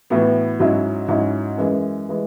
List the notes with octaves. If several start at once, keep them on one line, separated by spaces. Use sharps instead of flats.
A2 E3 B3 F#4
G#2 F#3 C#4 E4
G#2 F#3 C#4 E4
F#2 E3 G#3
E3 G#3